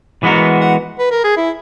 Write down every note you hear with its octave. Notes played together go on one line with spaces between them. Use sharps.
E3 G#3 B3 F#4 A#4
F#5
B4
A#4
G#4
E4